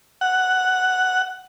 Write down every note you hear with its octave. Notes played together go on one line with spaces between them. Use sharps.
F#5